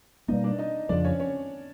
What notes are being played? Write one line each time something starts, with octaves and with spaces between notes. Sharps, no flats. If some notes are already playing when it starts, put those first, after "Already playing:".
B2 G3 A#3 D#4 D#5
D4 D5
D#4 D#5
F2 C#3 F3 D4 D5
C#4 C#5
C#4 C#5